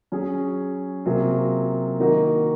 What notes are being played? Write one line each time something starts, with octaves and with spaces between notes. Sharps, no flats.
F#3 C#4 G#4
C3 F#3 A#3 F4 G#4
D#3 A#3 D#4 F#4